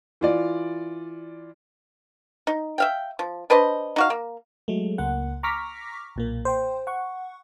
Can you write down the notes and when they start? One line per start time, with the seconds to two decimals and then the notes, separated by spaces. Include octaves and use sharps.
0.21 E3 F4 D5
2.47 D#4
2.78 E5 F5 G5
3.19 F3
3.50 D4 B4 C5 D#5
3.96 D#4 F#4 F5
4.10 A#3
4.68 F#3 G#3 A3
4.98 C#2 A#3 F#5
5.43 A#5 C#6 D6 F6 A#6 B6
6.16 B1 A#2 A#3
6.45 C5 G5
6.87 F#5 C#6